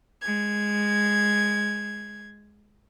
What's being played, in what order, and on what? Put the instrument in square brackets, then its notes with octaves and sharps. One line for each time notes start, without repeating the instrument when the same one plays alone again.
[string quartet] G#3 G#6